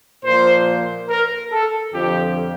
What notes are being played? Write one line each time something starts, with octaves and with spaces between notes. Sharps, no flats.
A#2 F3 C5
A#4
A4
F2 D3 F3 G4